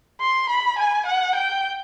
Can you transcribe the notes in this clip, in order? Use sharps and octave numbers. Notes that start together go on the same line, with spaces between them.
C6
B5
G#5
F#5
G5